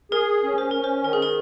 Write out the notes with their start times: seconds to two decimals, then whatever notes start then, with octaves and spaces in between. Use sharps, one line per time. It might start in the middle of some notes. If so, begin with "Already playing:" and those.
0.11 G#4 A#4
0.43 C#4
0.58 C5
0.71 C#4 A#4
0.84 C5
1.04 D#3 A#4
1.13 G#4
1.22 A#4